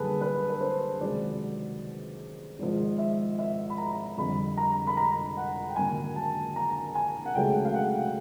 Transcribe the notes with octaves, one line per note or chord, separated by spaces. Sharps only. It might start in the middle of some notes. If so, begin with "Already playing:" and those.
Already playing: F#2 D3 G3 A#3 G#4 A4 B4
B4
B4
C5
C#2 C3 D#3 F#3 D5
G#1 G#2 F3
E5
E5
B5
A#5
F2 D3 G3 B5
A#5
B5
A#5
F#5
G5
G#1 F#2 D3 F#3 A#3 G#5
A5
A#5
G#5
F#5
C#2 C#3 F#3 A3 G5
F5
F#5